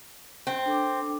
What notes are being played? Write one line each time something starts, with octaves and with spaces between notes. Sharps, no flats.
C4
D4 A4 D6